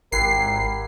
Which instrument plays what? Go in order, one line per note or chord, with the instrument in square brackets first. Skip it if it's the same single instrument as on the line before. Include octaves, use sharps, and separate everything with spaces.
[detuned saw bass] G#1 [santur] E4 G4 F#5 [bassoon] A#4 [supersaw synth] C7